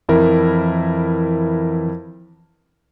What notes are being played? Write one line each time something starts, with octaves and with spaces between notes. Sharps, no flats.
F2 E3 E4 A#4